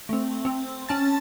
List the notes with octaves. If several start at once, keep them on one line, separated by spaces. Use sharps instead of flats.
A3 C4
C4
C#4 A5 A6